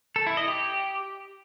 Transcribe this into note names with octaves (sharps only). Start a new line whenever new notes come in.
A4
E4
D#5
G4